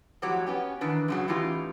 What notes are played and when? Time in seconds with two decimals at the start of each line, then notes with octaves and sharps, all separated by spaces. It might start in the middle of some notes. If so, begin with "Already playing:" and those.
0.22 F2 A2 F#3 G4 C#5 F#5
0.47 B3 C#4 G4
0.81 D#3 E3 D4 B4
1.08 F#2 C#3 F#3
1.28 A2 E3 C#4 D#4 F4 G4